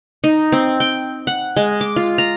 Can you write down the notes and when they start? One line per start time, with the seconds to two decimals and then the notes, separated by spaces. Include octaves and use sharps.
0.24 D#4
0.52 C4
0.80 G5
1.27 F#5
1.57 G#3
1.81 D6
1.96 F4
2.18 A#5